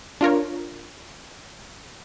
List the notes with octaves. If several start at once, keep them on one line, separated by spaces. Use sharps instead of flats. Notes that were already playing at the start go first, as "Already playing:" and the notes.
D4 F4 A#4 C#5